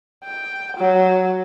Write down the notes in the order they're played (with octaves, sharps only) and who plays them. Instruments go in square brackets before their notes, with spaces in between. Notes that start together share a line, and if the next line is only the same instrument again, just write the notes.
[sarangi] G5
F#3